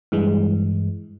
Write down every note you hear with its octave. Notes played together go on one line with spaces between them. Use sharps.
G2 E3 G#3